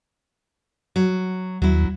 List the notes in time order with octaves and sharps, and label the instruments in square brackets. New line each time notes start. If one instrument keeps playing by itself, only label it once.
[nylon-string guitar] F#3
[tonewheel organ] D#2 [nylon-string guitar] F#3 E4